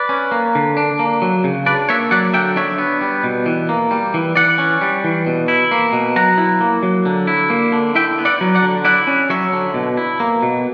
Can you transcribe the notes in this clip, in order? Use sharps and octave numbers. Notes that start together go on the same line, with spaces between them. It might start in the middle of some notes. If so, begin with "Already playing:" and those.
Already playing: B4 D5
C#4
A#3
D3
D4
A#3
F#3
C#3
D4 B4 D5
A#3 C#5 E5
F#3 D5 F#5
D3 E5 G5
D4 C#5 E5
B3
G3
B2
E3
A#3
G3
E3
E3 D5 F#5
C#4
G3
E3
B2
E4
A#3
B2
F#3 F#5 A#5
E4
A#3
F#3
D3
E4
A#3
D3
E4 E5 G5
B3
D5 F#5
F#3
D5 F#5
D3
E4 D5 F#5
C#4
F#3 C#5 E5
D3
B2
E4
A#3
B2